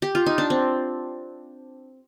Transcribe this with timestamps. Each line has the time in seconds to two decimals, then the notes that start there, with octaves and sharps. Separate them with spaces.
0.02 G4
0.15 F4
0.26 D#4
0.38 D4
0.50 C4